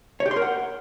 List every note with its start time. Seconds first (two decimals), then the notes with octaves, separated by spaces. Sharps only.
0.20 C#5
0.26 G4
0.31 C6
0.36 A#4
0.42 F#5